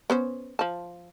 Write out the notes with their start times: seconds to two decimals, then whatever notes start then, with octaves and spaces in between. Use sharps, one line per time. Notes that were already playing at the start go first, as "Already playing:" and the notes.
0.10 B3 C#4 C5
0.59 F3 A5